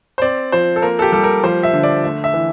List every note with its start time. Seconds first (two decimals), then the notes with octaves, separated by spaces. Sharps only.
0.18 C5
0.22 C4 D5
0.52 F3 C5
0.76 A4
0.82 A#3 A#4
0.99 A4
1.02 G4
1.12 G3 A4
1.23 A#4
1.44 F3 C5
1.63 E5
1.73 D3
1.83 D5
2.04 A3 E5
2.24 E5
2.34 E3